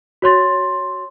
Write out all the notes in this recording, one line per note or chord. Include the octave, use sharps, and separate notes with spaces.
F#4 C#5 C6 A6